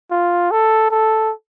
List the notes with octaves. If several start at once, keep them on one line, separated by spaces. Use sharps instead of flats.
F4
A4
A4